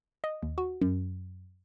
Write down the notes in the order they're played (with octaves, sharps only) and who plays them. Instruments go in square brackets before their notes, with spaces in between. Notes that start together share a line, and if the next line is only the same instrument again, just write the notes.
[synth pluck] D#5
D#2
F#4
F#2